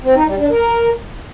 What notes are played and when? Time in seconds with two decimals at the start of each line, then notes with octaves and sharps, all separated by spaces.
0.03 C4
0.15 D#4
0.27 G3
0.39 D4
0.51 A#4